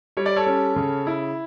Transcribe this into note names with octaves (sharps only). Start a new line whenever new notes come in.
G3 C#5
D5
A4 C#5
C#4
C#3
E4